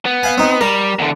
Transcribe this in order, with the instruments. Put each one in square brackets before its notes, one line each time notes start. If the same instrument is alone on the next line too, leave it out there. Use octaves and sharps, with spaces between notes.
[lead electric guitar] B3
[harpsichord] F5 G#5
C4 D#4
[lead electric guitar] G3 [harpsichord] A#4
[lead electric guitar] E2 D3